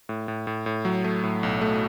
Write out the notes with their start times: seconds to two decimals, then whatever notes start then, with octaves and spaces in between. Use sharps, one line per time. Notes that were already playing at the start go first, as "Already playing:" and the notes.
0.09 A2
0.28 A2
0.47 A2
0.66 A2
0.85 F#3
1.04 A3
1.24 A2
1.43 B1
1.61 A3